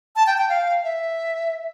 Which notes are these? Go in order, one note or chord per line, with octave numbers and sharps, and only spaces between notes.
A5
G5
G5
F5
E5